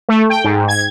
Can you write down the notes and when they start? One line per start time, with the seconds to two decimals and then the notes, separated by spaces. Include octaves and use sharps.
0.09 A3
0.30 G5
0.45 G#2
0.68 G#6